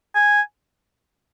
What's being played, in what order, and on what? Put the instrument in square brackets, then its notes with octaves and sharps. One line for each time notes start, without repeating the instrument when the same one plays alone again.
[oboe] G#5